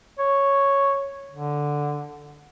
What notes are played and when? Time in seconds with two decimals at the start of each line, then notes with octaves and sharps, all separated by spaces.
0.19 C#5
1.31 D3